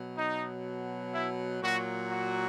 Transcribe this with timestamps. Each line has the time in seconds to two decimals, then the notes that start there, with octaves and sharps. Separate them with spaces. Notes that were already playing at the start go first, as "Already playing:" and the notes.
Already playing: B2 F#3
0.17 D#4
1.13 E4
1.62 A#2 F#3 F#4
2.11 F#4